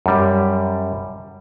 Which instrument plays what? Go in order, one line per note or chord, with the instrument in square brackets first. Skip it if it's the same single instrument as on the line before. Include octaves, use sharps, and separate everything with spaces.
[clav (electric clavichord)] F#2 G3